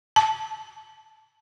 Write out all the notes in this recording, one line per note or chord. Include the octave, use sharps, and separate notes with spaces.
A5